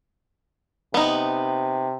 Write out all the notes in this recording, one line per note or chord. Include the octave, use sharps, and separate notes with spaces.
C3 B3 D#4